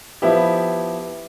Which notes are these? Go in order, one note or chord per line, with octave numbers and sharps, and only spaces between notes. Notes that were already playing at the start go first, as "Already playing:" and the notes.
F3 B3 E4 G4